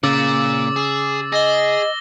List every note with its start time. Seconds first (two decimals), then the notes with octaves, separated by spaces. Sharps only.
0.03 A#2 C#3 D6 E6 A6
0.76 G#4
1.32 G#4 D#5 A#6 G7